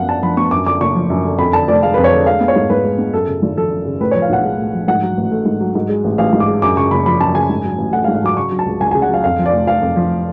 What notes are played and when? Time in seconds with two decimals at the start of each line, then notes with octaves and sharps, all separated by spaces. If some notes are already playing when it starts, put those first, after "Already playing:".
Already playing: F#2 F3 B3 F5 F#5
0.09 D4 A5
0.22 F3 B5
0.37 B3 C#6
0.51 F#2 D6
0.66 D3 D6
0.81 F#1 C#6
0.95 F3
1.10 F#2
1.25 D3
1.38 F2 B5
1.53 D3 A5
1.68 F1 D5
1.83 G#3 F5
1.94 F2 B4
2.04 C#5
2.11 D3
2.26 G#3 F5
2.41 B3
2.48 C#5
2.56 G#2
2.70 G#2 B4
2.84 G#3
2.99 B3
3.13 F#2 A4
3.28 C#3
3.42 G#1
3.57 F3 A4
3.71 F#2
3.85 C#3
4.01 A2 B4
4.11 F3 C#5
4.22 F5
4.29 B1 F#5
4.44 G#3
4.58 A2
4.74 F3
4.88 G#2 F#5
5.02 F#3
5.17 A1
5.32 A3
5.46 G#2
5.61 F#3
5.75 G#2
5.89 G#3
6.04 A1
6.18 A1 F5
6.33 G#2
6.40 D6
6.47 G#3
6.62 F#2 D6
6.77 C#3 C#6
6.91 F#1 B5
7.06 F3 B5
7.20 F#2 A5
7.35 C#3 G#5
7.50 G#2
7.64 F#3
7.78 A1
7.93 A3 F#5
8.04 F5
8.08 G#2
8.15 F5
8.23 F#3 D6
8.37 C#3 C#6
8.51 F#3
8.59 A5
8.66 C#2
8.80 C#2 G#5
8.91 C#3 G#5
9.02 F#5
9.09 F#3 F5
9.24 F2 F5
9.38 F3
9.46 D5
9.53 F1
9.67 F1 F5
9.81 F2
9.96 F3